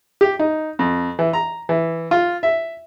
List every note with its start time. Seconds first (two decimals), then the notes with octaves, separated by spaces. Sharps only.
0.21 G4
0.39 D#4
0.79 F2
1.19 E3
1.33 A#5
1.69 E3
2.11 F4
2.43 E5